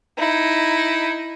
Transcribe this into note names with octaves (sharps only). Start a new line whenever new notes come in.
D#4 E4